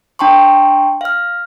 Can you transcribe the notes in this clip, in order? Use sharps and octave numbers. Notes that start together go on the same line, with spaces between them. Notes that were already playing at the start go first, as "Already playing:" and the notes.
D4 G5 A5 C6 C#6
F5 F6